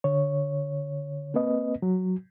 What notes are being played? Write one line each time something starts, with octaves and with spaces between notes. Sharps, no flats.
D3 C#5
A#3 C4 B4 D#5
F#3